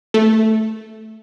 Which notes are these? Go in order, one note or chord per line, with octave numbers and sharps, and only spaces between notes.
A3